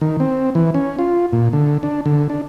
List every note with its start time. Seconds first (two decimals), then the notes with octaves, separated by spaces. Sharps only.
0.01 D#3
0.20 C4
0.55 E3
0.74 C#4
0.99 F4
1.33 A#2
1.53 D3
1.83 D4
2.06 D3
2.30 D4